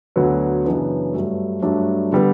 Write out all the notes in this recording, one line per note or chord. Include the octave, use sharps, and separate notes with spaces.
D2 D3 F#3 B3
F#2 C#3 E3 B3 D4
G2 F#3 A3
G2 F#3 A3 D4
D3 G3 B3